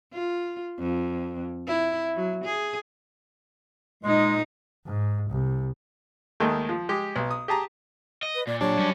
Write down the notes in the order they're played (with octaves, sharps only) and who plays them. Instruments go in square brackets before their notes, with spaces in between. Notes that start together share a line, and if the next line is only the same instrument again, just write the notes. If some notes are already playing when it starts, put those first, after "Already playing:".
[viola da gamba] F4
F2
E4
F#3
G#4
[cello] A#2 D#4 [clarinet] G#3
[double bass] G#2
C2
[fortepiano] D#2 D#3 G#3 A3
F3
G#3 G4
B1
D#6
G4 G#4 A5 A#5
[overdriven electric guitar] D#5
[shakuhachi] B4
[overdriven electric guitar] A#2 [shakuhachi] D5
[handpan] F#3 G4 [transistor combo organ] D4 [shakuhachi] C#5
[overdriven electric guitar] F#2 C#4 [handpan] G3